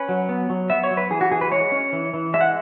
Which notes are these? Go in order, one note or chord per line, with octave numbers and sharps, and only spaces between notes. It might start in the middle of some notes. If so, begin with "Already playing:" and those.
Already playing: C#4 B4
F#3
B3
F#3
B3 E5
C#5
F#3
B4
E3 G#4
F#4
E3 G#4
B4
G#3 C#5
C#4
E3
E3
G#3 E5
F#5